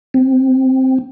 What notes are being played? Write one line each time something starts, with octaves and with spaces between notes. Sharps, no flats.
C4